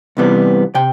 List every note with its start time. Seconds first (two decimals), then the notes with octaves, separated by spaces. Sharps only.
0.17 C2 C3 E3 G3 B3
0.75 C3 G5